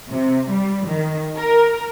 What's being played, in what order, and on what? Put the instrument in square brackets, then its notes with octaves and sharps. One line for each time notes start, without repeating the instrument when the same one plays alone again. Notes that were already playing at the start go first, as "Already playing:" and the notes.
[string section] C3
G3
D#3
A#4